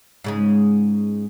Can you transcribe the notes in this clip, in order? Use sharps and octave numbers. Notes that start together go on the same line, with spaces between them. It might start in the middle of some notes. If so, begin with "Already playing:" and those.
G#2 C#3 G#3